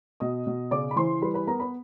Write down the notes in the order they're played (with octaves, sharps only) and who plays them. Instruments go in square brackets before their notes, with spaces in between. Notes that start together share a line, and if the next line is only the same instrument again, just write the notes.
[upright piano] B2 D#5 D#6
B2
C#3 D5 D6
B5
E3 C5 C6
G3 B4 B5
B4 B5
B3 A#4 A#5
B4 B5